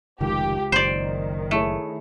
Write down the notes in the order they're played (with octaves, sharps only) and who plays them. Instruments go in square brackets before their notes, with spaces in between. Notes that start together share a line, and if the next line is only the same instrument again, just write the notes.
[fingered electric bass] F1 D#3 [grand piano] C#2 [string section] G4
[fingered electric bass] F#1 [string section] D#3 [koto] C5 D5
[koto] A3 [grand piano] E4 G#4 C#5